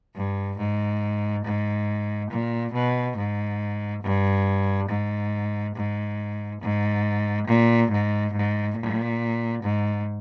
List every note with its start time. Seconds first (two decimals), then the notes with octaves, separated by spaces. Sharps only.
0.15 G2
0.58 G#2
1.44 G#2
2.31 A#2
2.73 B2
3.16 G#2
4.02 G2
4.89 G#2
5.75 G#2
6.61 G#2
7.47 A#2
7.90 G#2
8.33 G#2
8.77 A#2
9.62 G#2